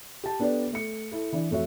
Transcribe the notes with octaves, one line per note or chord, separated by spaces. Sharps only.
G4 A5
B3 D4 G4 A4 B4 D5
A3 C#7
E4 A4
E3 D4
F2 A3 F#4 C#5 E5